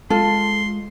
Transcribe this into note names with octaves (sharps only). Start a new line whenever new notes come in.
G#3 F4 A4 C6